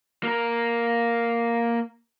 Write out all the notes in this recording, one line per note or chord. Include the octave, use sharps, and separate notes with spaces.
A#3 A#4